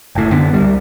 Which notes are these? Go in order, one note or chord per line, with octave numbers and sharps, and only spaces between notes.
F#1 A2
F#2 D3 B3 D4
C#2 G3